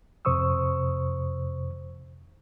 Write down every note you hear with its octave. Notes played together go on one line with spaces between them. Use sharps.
F2 C3 C5 C#6 D#6 E6